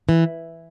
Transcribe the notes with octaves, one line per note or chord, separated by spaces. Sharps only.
E3